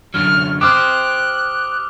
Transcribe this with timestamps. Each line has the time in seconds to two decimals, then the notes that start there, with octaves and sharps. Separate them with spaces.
0.14 F#2 D3 F#3 F6
0.61 G4 C5 D6 D#6 F6 F#6